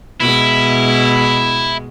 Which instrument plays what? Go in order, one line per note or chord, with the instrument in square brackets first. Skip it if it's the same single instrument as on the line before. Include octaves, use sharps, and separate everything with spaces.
[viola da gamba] B2 G#3 [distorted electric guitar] E4